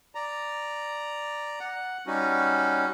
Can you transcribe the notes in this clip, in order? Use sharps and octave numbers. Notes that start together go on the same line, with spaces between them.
D5 A#5
F#5
G3 C#4 D#4 F#4